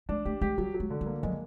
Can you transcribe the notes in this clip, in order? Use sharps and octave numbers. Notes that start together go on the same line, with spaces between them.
G#3 D4
A3 G4
G#3 G4
F#3 G3
F#3
G#3
D3
G3
A#3
F#3 G#3